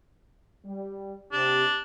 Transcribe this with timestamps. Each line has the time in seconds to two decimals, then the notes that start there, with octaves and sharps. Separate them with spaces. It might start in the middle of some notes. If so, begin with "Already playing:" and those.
0.65 G3
1.32 C3 D4 G4